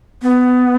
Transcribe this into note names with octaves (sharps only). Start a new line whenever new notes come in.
B3